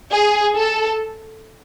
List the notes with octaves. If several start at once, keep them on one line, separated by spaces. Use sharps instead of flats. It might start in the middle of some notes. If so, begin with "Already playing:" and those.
G#4
A4